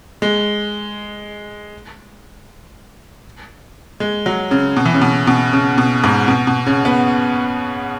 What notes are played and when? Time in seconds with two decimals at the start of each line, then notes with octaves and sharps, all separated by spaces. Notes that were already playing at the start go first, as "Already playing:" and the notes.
0.22 G#3
4.00 G#3
4.26 F#3
4.51 C#3
4.76 B2
4.86 E3
4.94 C#3
5.01 B2
5.27 B2
5.53 C#3
5.78 B2
6.04 G#2
6.28 B2
6.47 B2
6.66 C#3
6.85 B3